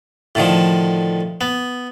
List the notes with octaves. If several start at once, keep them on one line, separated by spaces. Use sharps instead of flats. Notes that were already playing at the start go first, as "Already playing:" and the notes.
A2 D3 D#3 F3
B3